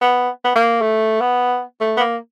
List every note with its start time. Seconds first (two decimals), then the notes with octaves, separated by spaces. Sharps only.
0.01 B3
0.44 B3
0.55 A#3
0.81 A3
1.20 B3
1.81 A3
1.97 B3
2.00 A#3